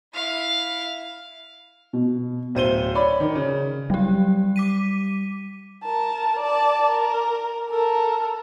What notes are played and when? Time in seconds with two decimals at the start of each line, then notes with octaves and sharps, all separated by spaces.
0.14 E4 F5
1.93 B2
2.55 D1 C5 D#7 G7
2.95 C#5 D5 B5
3.20 D#3
3.35 C#3
3.90 F#3 G3 G4
4.56 D6 B6 D#7
5.83 A#4 A5
6.39 D5 A5
6.89 A#4
7.70 A4 A#4